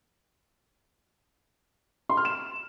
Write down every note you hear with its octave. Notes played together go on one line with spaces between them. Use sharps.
C6
F6
E7